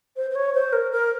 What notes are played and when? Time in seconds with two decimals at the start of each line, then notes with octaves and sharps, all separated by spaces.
0.16 C5
0.30 C5
0.35 C#5
0.54 C5
0.72 A#4
0.91 A#4